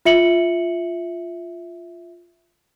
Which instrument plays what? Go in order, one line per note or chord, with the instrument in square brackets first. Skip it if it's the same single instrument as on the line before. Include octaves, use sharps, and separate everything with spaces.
[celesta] F4 E5 C#7 F#7